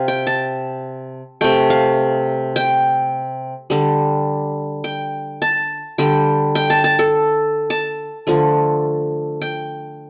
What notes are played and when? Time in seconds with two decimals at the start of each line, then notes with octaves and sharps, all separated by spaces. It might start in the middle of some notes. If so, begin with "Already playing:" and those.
Already playing: C3 F5
0.08 G5
0.27 A5
1.41 C3 A3 G5
1.70 F5
2.56 G5
3.70 D3 G3
4.84 G5
5.42 A5
5.98 D3 G3 G5
6.55 G5
6.70 A5
6.84 A5
6.99 A4
7.70 A5
8.27 D3 F3 A3
9.42 G5